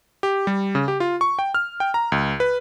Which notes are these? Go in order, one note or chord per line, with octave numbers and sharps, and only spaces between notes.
G4
G3
C#3
G4
F4
C#6
G5
F6
G5
A#5
C#2
B4